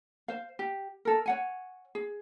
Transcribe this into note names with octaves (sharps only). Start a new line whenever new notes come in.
C5 F5
G4
A4 A#4
C#5 F#5 G#5
G#4